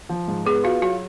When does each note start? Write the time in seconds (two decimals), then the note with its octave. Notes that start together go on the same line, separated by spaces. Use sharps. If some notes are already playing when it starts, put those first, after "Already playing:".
0.09 F3
0.28 G#2
0.45 B3 G#4
0.64 F4 F#4
0.82 F#3 F#4